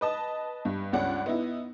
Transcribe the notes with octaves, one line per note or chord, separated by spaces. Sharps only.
B4 D#5 A5
G2
C#2 G2 C#4 D5 F#5
B3 D#4 E4